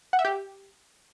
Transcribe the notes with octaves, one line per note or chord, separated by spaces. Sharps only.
F#5
E5
G4